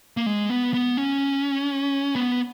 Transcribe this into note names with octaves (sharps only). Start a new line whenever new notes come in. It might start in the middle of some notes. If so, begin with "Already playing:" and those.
A#3
G#3
B3
B3
C#4
B3